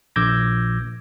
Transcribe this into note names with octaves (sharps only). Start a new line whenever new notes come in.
A#1 D6 E6 G6 G#6 A#6